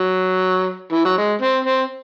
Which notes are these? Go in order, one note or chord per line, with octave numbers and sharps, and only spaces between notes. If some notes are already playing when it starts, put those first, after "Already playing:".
Already playing: F#3
E3
F#3
G#3
C4
C4